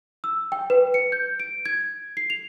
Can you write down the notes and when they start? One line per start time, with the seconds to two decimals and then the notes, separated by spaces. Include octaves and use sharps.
0.24 E6
0.52 G5
0.70 B4
0.94 C#7
1.12 G6
1.40 D7
1.66 G#6
2.17 C7
2.30 F7